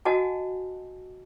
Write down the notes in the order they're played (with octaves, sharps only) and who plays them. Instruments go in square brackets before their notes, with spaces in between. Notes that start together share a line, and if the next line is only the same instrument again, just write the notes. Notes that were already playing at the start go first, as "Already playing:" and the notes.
[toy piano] F#4 D#5 F#5 G#5 A5